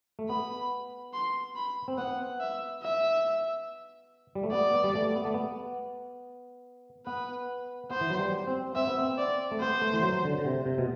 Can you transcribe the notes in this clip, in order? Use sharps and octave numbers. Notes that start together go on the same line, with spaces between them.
A3
B3 B5
C6
B5
C4
B3 F#5
E5
E5
G3
A3
B3 D5
B3
G3
A3
B3
A3
B3
B3 B4
B3 C5
E3
F#3
G3
C4
C4 E5
B3
C4
D5
A3
B3 C5
A3
E3
F#3
D3
D3
C3
C3
B2